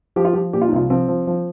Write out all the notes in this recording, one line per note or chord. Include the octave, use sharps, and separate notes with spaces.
F3 G4
F4
F3 G4
A#2 G4
F4
D#4
C2 F4
F3 C4
F3
F3